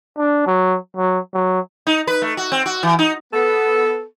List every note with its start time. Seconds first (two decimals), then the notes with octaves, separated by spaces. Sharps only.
0.18 D4
0.47 F#3
0.97 F#3
1.34 F#3
1.87 D#4
2.07 B4
2.22 A3
2.37 F#4
2.52 C4
2.66 F#4
2.83 E3
2.99 D#4
3.33 B3 A4